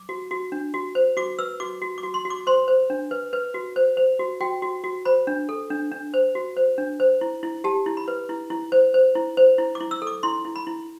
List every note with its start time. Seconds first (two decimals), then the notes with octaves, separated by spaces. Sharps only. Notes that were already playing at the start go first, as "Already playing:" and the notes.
Already playing: D6
0.09 F#4
0.31 F#4
0.52 D4
0.74 F#4
0.95 C5
1.17 F#4 D6
1.39 B4 E6
1.60 F#4 D6
1.82 F#4
1.98 D6
2.03 F#4
2.14 C6
2.25 F#4
2.30 D6
2.47 C5 C6
2.68 C5
2.90 D4
3.11 B4
3.33 B4
3.54 F#4
3.76 C5
3.97 C5
4.19 F#4
4.41 F#4 G5
4.62 F#4
4.84 F#4
5.05 C5 B5
5.27 D4
5.49 A4
5.70 D4
5.92 D4
6.14 C5
6.35 F#4
6.56 C5
6.78 D4
7.00 C5
7.21 E4
7.43 E4
7.64 G4 A5
7.86 E4
7.97 B5
8.08 B4
8.29 E4
8.50 E4
8.72 C5
8.94 C5
9.15 E4
9.37 C5
9.58 E4
9.75 D6
9.80 E4
9.91 E6
10.02 A4
10.07 D6
10.23 E4 C6
10.45 E4
10.56 B5
10.67 E4